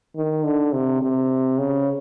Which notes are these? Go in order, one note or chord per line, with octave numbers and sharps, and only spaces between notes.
D#3
D3
C3
C3
C#3